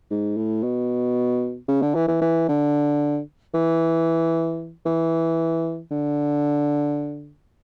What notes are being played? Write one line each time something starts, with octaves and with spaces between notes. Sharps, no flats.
G#2
A2
B2
C#3
D3
E3
E3
E3
D3
E3
E3
D3